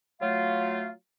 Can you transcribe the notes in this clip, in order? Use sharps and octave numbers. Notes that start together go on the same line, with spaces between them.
F#3 A3 F4 F5